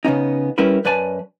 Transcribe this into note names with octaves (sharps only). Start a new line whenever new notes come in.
C#3 B3 C#4 D#4
G3 C#4 E4 A#4 B4
F#2 B4 D5 G#5 A5